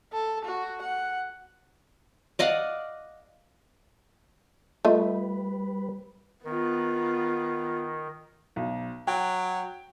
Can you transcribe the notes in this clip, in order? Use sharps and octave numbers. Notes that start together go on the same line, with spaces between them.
A4
F#4
F#5
D5 D#5 F5 F#5
G3 A3 F4 B4 D#5
D#3 B3 F4
B1
F#3 G5